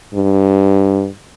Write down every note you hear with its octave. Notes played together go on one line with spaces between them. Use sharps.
G2